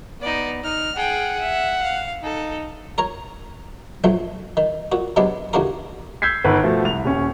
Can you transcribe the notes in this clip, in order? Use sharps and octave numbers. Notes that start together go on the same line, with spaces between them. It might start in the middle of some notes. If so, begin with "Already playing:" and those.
B3 D#4 D5
D#4 F6
G#4 F#5 G5
E5
F5
D#4 A4
A#4 C#5 A#5
A#1 F2 F3 F#3 A3
D#3
A#2 F#4
C3 F#3 G#3 B3 D4
D#2 A2 C#3 D4 F#4 A#4
E6 G6 G#6 B6 C7
G1 D#3 B4
B2 F3 A3
C2 F7
D#1 C#4